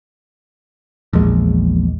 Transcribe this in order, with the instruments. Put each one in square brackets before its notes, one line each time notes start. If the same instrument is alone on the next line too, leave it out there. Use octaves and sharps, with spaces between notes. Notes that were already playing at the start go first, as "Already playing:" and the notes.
[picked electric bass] A#1 E2 G#3